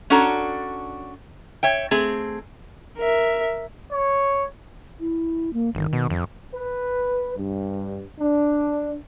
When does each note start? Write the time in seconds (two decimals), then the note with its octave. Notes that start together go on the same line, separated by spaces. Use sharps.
0.10 C#4 D4 F#4 A4 A#5
1.63 C#5 E5 G5
1.91 A3 C4 G#4
2.98 A#4 E5
3.92 C#5
5.00 E4
5.53 A#3
5.75 G1 D#3
5.93 B2
6.10 F2
6.52 B4
7.36 G2
8.19 D4